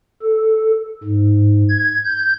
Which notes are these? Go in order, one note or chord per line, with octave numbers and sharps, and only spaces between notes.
A4
G#2
G#6
G6